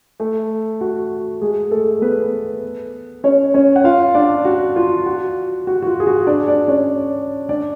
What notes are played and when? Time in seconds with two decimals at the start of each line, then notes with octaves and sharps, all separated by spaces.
0.20 A3 A4
0.81 F#4
1.41 G#3 G#4
1.71 A3 A4
2.02 B3 B4
3.24 C#4 C#5
3.54 C#4 C#5
3.76 F#5
3.84 F4 F5
4.14 D4 D5
4.45 F#4
4.76 F4
5.06 F#4
5.67 F#4
5.82 F#4
5.87 F4
6.00 G#4
6.07 F#4
6.27 D4 D5
6.48 D4 D5
6.68 C#4 C#5
7.49 D4 D5